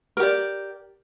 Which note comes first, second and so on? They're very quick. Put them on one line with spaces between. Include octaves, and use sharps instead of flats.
A#4 G4 D5